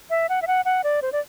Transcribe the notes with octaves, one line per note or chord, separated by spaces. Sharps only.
E5
F#5
E5
F#5
F#5
D5
C5
D5